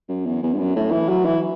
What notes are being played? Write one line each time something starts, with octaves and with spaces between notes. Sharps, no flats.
F#2
E2
E2
G2
F#2
A2
E3
F#3
E3